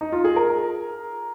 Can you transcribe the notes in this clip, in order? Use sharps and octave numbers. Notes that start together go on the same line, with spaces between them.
D#4
F4
G#4
A#4